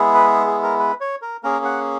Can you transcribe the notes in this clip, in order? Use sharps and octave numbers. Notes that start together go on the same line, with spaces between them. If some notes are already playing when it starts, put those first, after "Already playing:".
Already playing: G#3 B3 E4 G#4
B4
G#4
A#4
B4
C#5
A#4
A#3 C#4 G#4 A#4
F#5